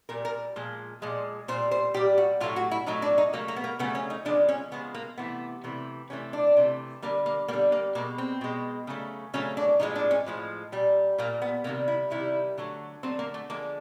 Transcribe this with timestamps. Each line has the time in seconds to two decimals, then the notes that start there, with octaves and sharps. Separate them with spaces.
0.09 A#2 G3 A#4
0.25 A#4
0.56 A#2 F3 G#3
1.02 A#2 F3 G#3
1.48 A#2 G3 C5
1.71 C5
1.94 A#2 G3 G4
2.18 F#4
2.40 A2 F#3 A3 F4
2.56 F#4
2.71 E4
2.86 A2 F#3 A3 D#4
3.02 D4
3.18 D#4
3.33 C#3 F#3 A3 A#3
3.48 A#3
3.56 B3
3.64 A#3
3.79 C#3 F#3 A3 B3
3.95 C#4
4.10 D#4
4.25 C#3 F3 G#3 D4
4.48 C#4
4.72 C#3 F3 G#3 B3
4.94 A#3
5.17 C3 E3 A3 B3
5.64 C3 E3 A3
6.10 C3 E3 A3 C#4
6.33 D4
6.57 C3 E3 A3
7.02 D3 G3 A#3
7.26 A#3
7.48 D3 G3 A#3
7.72 A#3
7.95 B2 A#3
7.98 G#3
8.18 C4
8.41 B2 G#3
8.87 C#3 F#3 A3
9.34 C#3 F#3 A3 C#4
9.57 D4
9.80 A2 F3 G#3 D#4
9.95 D4
10.11 C#4
10.26 A2 F3 G#3
10.72 A#2 G3
11.18 A#2 G3 A#3
11.42 B3
11.64 C3 D#3 G3 A#3
11.88 E4
12.11 C3 D#3 G3 E4
12.58 D3 F#3 A3
13.03 D3 F#3 A3 C4
13.19 A#3
13.34 A3
13.50 D3 F3 G#3 A#3